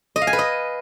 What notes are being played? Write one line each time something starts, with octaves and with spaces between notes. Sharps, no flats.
D#5
F5
G#5
B4
D#5